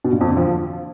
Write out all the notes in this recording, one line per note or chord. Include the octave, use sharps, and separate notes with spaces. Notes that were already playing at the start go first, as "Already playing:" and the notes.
B2
A#2
F2
D3
F3